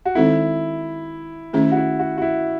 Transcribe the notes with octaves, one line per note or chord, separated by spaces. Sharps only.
F#4
D#3 G#3 C4 D#4 E4 A4
D#3 A3 C#4 E4 G#4
F#4
E4
F#4
F#4
E4